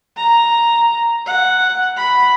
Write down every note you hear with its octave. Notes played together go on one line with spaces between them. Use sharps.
A#5
F#5
B5